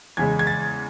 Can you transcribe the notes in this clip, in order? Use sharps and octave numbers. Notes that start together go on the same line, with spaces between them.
E2 C#3 G#3 G#6
G#6
A6